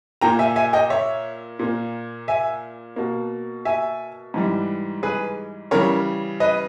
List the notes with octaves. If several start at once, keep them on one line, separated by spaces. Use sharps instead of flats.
A#2 A#3 G5 A#5
E5 G#5
E5 G#5
D#5 G5
C#5 E5
A#2 A#3
E5 G#5
B2 A#3
E5 G#5
G#2 E3 G3
G#4 B4
C#3 E3 G3 A#4 C#5
B4 D#5